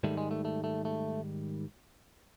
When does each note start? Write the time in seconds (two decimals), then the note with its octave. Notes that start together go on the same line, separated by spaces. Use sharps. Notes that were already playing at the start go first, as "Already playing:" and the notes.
0.04 G#2 D#3 G3 A3
0.17 G#3
0.31 A3
0.45 A3
0.64 A3
0.85 A3